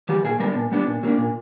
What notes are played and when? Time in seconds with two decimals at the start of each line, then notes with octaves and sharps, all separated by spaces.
0.09 E3 G3 G4
0.24 A#2 G#4
0.40 G3 B3 D4 A#4
0.55 A#2
0.72 G3 B3 D4
0.87 A#2
1.03 F#3 A#3 D4
1.18 A#2